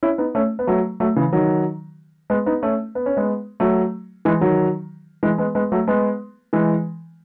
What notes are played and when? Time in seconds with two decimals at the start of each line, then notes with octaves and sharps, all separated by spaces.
0.03 C#4 E4
0.18 B3 D#4
0.35 A3 C#4
0.59 B3
0.67 F#3 A3
1.00 F#3 A3
1.16 C#3 E3
1.33 D#3 F#3
2.30 G#3 B3
2.46 B3 D#4
2.62 A3 C#4
2.95 B3
3.06 C#4
3.17 G#3 B3
3.60 F#3 A3
4.25 E3 G#3
4.41 D#3 F#3
5.23 E3 G#3
5.38 G#3 B3
5.55 G#3 B3
5.72 F#3 A3
5.88 G#3 B3
6.53 E3 G#3